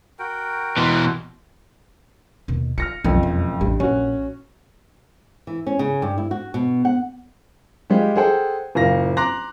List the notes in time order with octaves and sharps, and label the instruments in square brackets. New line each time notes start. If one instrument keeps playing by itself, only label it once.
[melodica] F#4 A#4 G5
[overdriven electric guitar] B2 E3 [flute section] C6
[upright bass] D#2 B2
[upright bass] F4 [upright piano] F6 A#6 C#7
[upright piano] F#1 F2 [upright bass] B1
[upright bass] E1
[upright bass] A1 [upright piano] G2
[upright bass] A#1 [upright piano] C#4 F#4
[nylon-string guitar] E3
C#4
C#3
G2
E4
F#4
B2
F#5
[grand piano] G3 G#3 F4 G4
G#4 A4 C5 F#5 G5
F#1 A#2 A#4 F5 A#6
A#5 C6 D6 F#6 A#6